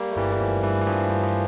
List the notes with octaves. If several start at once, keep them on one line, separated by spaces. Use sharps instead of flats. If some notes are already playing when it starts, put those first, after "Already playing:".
Already playing: G3 A#3
A3
G1 E3 G3
E3
G1 F3
G2 E3
E3
G2 F3
G2 F3
F3